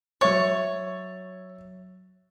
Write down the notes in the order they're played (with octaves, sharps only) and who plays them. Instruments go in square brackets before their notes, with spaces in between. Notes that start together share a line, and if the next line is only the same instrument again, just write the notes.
[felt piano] F#3 E5 A6 [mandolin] C#5